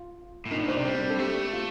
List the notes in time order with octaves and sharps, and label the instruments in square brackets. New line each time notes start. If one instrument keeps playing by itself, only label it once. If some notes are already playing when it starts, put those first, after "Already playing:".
Already playing: [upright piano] F4
[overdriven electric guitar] A2
[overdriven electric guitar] A#2 [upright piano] D#4
[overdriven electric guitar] A2 [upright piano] D4
[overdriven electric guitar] A#2 [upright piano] C5
[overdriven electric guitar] C3 [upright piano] D5
[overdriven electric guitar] G3 [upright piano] C5
[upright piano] D4
C4
A4
[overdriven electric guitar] A3 [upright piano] G4
[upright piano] F4